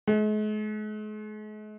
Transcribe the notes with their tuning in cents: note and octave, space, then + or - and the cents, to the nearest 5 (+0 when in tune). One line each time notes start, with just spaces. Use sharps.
G#3 +45